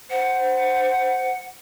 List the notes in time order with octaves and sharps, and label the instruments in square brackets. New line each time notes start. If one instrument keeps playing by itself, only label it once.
[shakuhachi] C5 [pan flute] F#5